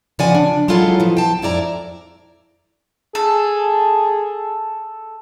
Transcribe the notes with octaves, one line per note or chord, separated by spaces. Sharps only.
C#3 F3 D5 F#5 G#5
D4
F#3 G#3 E4 F4 A4 F5
B2 F3
G5 A5
F2 E4 D5 A#5
G#4 A4